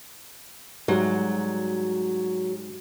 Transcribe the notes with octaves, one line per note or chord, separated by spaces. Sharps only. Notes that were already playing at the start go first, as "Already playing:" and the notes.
G#2 F#3 G3